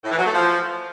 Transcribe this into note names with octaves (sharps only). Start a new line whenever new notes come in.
A2
E3
F#3
A3
F3